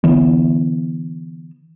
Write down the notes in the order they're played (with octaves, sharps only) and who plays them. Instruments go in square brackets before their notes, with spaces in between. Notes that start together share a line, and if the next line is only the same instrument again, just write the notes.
[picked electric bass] D3 E3 B3